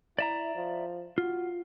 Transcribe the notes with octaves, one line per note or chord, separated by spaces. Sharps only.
E4 D5 E5 A#5
F3
F4 F#4